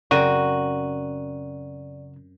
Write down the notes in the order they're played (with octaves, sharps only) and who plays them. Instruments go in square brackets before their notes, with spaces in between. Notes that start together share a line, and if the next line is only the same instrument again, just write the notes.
[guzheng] F#2 C4 G5 [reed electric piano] C#3 A#5 [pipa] F#4 [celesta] D5 D#7